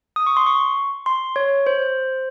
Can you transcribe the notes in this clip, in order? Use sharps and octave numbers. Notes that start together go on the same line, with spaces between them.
D#6
C#6
C6
C#6
C6
C#5
C5